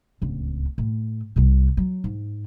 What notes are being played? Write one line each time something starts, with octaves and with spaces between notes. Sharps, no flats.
D1 C#2
A2
C2 C3
F#3
G#2